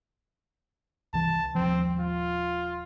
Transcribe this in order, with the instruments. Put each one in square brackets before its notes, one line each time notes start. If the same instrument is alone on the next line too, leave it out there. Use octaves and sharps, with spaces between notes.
[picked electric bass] C2 E3 [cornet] A5
[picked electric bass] D#1 G#1 F3 [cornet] C4
[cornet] F4